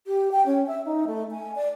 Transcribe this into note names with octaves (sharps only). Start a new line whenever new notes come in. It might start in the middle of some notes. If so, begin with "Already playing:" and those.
G4
G5
C#4
E5
D#4
A3
G#5
D5